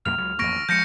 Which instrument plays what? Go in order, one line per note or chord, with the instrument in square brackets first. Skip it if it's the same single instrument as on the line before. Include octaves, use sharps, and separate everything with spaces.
[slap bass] B1 F#2 A#3 [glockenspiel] F6 F7
[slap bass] C#2 F#3
[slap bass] A1 F2 A#3 [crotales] C#6 A#6 D7
[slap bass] D2
[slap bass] F3 G#3 [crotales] G6 A#6 C#7